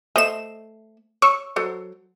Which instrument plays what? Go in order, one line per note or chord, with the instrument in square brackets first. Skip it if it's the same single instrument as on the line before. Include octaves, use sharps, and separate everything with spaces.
[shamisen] A3 C5 E5 [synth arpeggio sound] D#5 E7
[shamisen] C#5 [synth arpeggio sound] C#6 E6
[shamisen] F#3 A4 C5